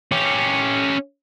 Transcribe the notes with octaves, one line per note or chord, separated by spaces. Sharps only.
C#4 G4